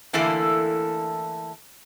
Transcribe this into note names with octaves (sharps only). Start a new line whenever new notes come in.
D3 E3 A3 A#3 E4 A4